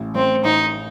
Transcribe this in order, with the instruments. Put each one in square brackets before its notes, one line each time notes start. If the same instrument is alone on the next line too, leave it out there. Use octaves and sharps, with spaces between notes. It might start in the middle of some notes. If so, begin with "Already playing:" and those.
Already playing: [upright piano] A1
[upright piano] A1 [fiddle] C4
[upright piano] A1 [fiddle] D#4